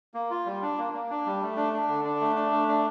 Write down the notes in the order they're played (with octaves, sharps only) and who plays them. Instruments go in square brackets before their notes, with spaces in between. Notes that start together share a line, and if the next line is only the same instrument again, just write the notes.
[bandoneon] A#3
F4
G3
D4
A#3
A#3
D4
G3
A3
D4
D4
D3
D4
A3
D4
A3
D4